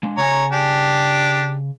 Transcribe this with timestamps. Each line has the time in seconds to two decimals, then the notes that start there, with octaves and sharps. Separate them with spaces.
0.03 G#3 D4
0.18 C#3 C#5 G#5 A#5
0.52 D4 G4